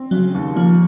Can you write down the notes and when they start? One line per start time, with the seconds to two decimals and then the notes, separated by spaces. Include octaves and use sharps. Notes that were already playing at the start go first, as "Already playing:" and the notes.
Already playing: C4
0.11 C#3 F#3
0.34 D#2
0.56 F3 A#3